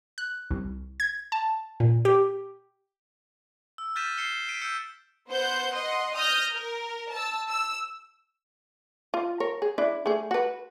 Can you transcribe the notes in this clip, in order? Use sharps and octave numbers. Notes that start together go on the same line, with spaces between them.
F#6
C2
G#6
A5
A#2
G4
E6
F6 G6 A6 B6 D#7 E7
C7 C#7 E7 G7
B6 D7 D#7
E6 G6 C#7
B3 C5 F#5 G6
D#5 F#5 C6
D#6 F6 G6 A#6
A#4
A5 E6
E6
F4
A#4 C#5
G#4
D4 E4
A3 G#4
F#4 B4